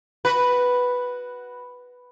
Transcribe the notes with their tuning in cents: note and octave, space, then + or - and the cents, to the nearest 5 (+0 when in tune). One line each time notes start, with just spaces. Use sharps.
F#4 +10 B4 +0